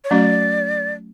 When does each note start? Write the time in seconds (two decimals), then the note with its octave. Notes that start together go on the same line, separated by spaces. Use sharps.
0.04 C#5
0.10 F#3 A3 C#4 F#4 D5